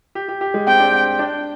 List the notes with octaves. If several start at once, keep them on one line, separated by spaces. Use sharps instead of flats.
G4
G4
G4
G#3
C4 G5
D4
C4
D4